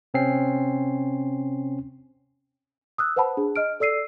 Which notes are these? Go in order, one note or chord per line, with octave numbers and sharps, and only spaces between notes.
C3 C4 C#4 C7
D#6 E6 F#6
B4 C5 F#5 A5 B5
D4 G#4
D#5 F6 D7
A4 D5 E6 C7 D#7